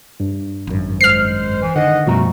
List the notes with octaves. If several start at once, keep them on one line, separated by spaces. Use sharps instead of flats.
G2
G#1 F#2
G#3 C5 F6 C7
E3
D3 D#3 D#5 F#5
F#2 B2 F3 G3 A3 C#4 F#4 A#5